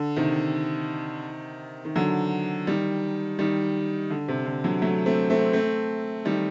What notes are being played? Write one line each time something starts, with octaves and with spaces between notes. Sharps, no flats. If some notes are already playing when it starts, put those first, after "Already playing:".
Already playing: D3
C3 D#3
D#3
D3 F#3
D#3 G3
D#3 G3
D3
C3
D3
D3 F#3
F#3 A3
A3 C4
A3 C4
A3 C4
D#3 G3